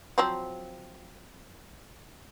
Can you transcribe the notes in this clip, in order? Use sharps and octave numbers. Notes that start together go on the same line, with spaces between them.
F3 F#3 C4